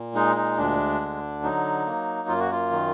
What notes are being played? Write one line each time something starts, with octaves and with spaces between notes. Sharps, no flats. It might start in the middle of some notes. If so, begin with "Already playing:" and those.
Already playing: A#2
G#3 D#4
D#4
D2 D4
D3
F#3 D#4
A#3
F#2 F4
F#4
F4
D#3